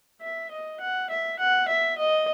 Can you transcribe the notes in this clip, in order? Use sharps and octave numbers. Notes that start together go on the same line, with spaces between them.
E5
D#5
F#5
E5
F#5
E5
D#5